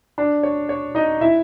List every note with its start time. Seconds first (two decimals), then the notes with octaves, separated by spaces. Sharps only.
0.18 D4 D5
0.43 C#5
0.69 C#5
0.95 D#4 D#5
1.21 E4 E5